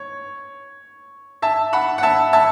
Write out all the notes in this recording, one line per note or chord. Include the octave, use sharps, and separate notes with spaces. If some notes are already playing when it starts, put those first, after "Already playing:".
Already playing: C#5
E5 A5
F#5 B5
F#5
E5 A5
E5 A5